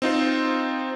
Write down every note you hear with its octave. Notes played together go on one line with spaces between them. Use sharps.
C4 D#4 F4 C5